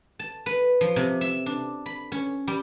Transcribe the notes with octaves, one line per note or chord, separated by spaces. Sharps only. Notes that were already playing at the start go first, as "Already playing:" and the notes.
A5
B4
F3
C3
E5
D4
B5
C#4
G3